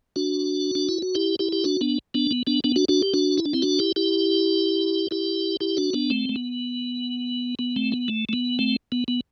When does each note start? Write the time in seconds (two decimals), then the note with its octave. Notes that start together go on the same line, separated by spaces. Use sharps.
0.16 D4 F#4
0.75 D4
0.89 E4
1.02 F#4
1.15 E4 G4
1.39 E4 G4
1.52 G4
1.64 D4 F#4
1.81 B3 D4
2.14 B3 D4
2.31 B3
2.47 B3 D4
2.64 B3 D4
2.76 D4 F#4
2.88 D4 F#4
3.03 G4
3.14 D4 F#4
3.38 E4
3.45 D4
3.53 C4 E4
3.62 D4 F#4
3.79 E4 G4
3.96 E4 G4
5.11 E4 G4
5.60 E4 G4
5.77 D4 F#4
5.93 B3 D4
6.10 A3 C4
6.29 A3
6.36 B3
7.59 B3
7.76 A3 C4
7.92 B3
8.08 A3
8.29 A3
8.33 B3
8.59 A3 C4
8.92 B3
9.08 B3